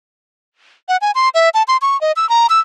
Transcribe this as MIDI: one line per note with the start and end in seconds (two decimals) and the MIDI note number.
0.89 0.97 78
1.01 1.11 80
1.15 1.29 84
1.34 1.49 76
1.54 1.63 81
1.68 1.77 84
1.82 1.99 85
2.01 2.12 75
2.16 2.29 88
2.29 2.47 82
2.50 2.60 88